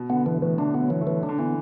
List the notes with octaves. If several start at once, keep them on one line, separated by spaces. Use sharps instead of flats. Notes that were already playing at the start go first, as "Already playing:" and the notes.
Already playing: B2
D3 B3
B2 E3
A2 E3
D3 D4
B3
F#3
E3 F#3
A3
E3
D4
D3
E3 B3